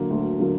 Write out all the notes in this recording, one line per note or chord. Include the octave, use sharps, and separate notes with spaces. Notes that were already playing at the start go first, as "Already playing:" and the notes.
Already playing: D3 F#3 A#3
D2
D3 F#3 A#3